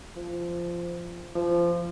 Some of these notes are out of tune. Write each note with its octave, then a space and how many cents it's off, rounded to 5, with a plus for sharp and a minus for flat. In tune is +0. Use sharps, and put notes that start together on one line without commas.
F3 -15
F3 -20